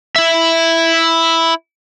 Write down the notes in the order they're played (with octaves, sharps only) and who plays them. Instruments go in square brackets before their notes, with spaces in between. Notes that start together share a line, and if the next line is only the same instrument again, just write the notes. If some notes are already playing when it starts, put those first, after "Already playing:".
[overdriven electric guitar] E4 E5